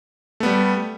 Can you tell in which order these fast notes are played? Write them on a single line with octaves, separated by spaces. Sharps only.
A3 B3 G3